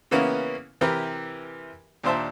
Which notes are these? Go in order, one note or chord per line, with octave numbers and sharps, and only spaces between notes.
C#3 E3 A#3 B3 C#4 E4
C3 E3 G4 A#4 B4
D#2 A#2 D4 C5 E5 A5